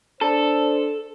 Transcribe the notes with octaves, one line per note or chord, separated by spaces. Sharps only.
D4 A4 C5